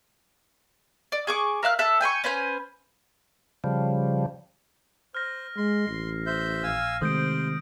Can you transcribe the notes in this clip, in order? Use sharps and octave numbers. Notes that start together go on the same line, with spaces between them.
D5
G#4 C#6 D6
A#4 E5 F5 F#6
A4 E5 F#6
G5 G#5 B5 C#6
C#4 B4 C5 G#5
C#3 F3 G3
C5 F6 A#6
G#3 C6
A1 C7
C5 E5 G6
A#1 F5 G#5 E6
C3 D#3 G#3 A3 C5 D#6 G6 D7